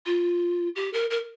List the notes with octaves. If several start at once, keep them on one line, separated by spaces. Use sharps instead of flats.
F4
G4
A#4
A#4